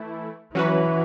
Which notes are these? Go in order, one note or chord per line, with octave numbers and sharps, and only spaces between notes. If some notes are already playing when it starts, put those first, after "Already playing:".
Already playing: E3 A3 E4
E3 F#3 C#4 F#4 B4